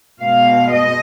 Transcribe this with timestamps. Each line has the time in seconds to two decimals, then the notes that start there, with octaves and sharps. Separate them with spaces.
0.21 B2 G#3 F5
0.70 D#5